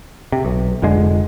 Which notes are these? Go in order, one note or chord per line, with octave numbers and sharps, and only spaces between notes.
C3
B1
F1 F2 D3 G#3